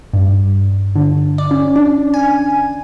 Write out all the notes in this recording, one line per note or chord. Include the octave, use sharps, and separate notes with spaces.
G2
D3
D5
C#4
D4
G#5